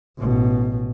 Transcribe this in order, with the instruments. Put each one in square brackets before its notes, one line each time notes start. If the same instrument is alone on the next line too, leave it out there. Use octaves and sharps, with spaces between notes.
[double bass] A1 B2